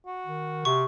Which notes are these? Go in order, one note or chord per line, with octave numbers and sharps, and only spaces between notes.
F#4
D#3
C3 C#6